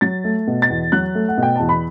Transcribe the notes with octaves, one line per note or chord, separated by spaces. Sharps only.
F#3 A6
A3
B2
A6
E2
F#3 F#6
A3
F#5
B2 G5
E2 A5
B5